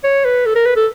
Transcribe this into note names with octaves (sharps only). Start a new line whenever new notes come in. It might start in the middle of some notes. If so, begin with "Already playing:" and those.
C#5
B4
A4
A#4
B4
A4